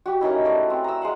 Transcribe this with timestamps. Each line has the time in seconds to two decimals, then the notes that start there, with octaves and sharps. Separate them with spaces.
0.06 F#4 G4
0.21 A#3 C#4 D#4 E4
0.45 A3 D5
0.70 C4
0.84 A#5 E6
1.02 G#3 F5 F#5